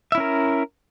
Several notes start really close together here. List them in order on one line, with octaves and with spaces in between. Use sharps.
E5 E4 C#4 A#4